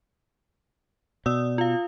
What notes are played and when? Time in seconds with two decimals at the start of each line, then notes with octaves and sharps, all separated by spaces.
1.26 B2 D5 D#6 E6
1.58 F4 F5